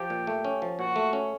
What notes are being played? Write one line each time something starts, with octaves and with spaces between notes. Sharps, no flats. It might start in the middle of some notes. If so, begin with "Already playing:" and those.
Already playing: F3 G4
A#2
A3
C#4
F3
A#2 F#4
A3
C#4